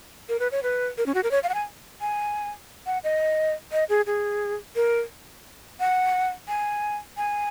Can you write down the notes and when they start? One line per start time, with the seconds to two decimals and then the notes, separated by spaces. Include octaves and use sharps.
0.29 A#4
0.40 B4
0.52 C#5
0.63 B4
0.98 A#4
1.06 C#4
1.14 F#4
1.24 A#4
1.31 C#5
1.43 F5
1.49 F#5
1.54 G#5
2.01 G#5
2.86 F#5
3.04 D#5
3.72 D#5
3.89 G#4
4.07 G#4
4.76 A#4
5.80 F#5
6.48 G#5
7.17 G#5